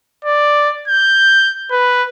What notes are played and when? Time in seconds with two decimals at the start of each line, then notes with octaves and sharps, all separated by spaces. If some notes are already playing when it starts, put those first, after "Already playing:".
0.25 D5
0.88 G6
1.71 B4